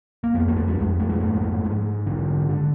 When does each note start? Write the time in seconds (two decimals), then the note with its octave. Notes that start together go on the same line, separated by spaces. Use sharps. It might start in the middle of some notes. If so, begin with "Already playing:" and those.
0.24 A#3
0.34 F2 B3
0.48 A#3
0.56 A3
0.68 G3
0.78 F2 G#3
0.99 A3
1.09 G#3
1.20 G#2 A3
1.64 G#2
2.06 D3
2.49 D3